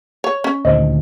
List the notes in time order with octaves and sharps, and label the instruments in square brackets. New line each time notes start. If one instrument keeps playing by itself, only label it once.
[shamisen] C#5
C#4
[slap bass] D2 A#2 D#3 [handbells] C5 D#5